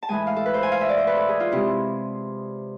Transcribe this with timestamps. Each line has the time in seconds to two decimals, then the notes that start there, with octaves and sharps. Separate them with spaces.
0.03 A5
0.09 A2 E3 G#3 G#5
0.27 F5
0.36 A4
0.46 B4
0.54 C5
0.63 G#5
0.72 F5
0.81 E5
0.89 D5
0.98 C5
1.07 B4
1.16 A4
1.28 G#4
1.40 F4
1.52 C3 G#3 E4